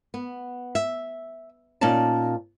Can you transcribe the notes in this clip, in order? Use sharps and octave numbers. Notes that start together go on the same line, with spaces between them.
B3
E5
A#2 C#4 D#4 D5 A5